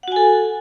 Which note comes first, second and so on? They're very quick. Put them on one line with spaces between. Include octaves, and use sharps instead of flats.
F#5 F#4 G#5 A4